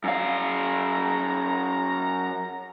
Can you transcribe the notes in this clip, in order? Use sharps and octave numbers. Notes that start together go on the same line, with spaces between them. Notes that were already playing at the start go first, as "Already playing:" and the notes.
F#2 F5 A#5